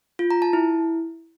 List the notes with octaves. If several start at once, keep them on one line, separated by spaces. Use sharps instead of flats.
F4
A#5
A5
E4